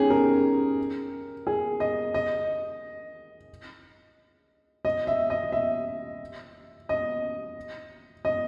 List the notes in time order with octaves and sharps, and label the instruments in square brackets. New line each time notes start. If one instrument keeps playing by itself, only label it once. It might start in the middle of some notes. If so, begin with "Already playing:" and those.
Already playing: [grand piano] C#4 D#4 G4 G#4
A#4
G#4
D#5
D#5
D#5
E5
D#5
E5
D#5
D#5